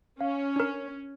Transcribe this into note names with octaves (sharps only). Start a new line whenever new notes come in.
C#4 F5
D4 A#4